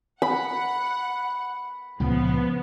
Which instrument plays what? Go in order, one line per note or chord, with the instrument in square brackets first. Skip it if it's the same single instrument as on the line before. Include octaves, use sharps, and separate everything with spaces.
[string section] F#5 [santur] B5
[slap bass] C#2 A#2 C#3 [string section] F3 B3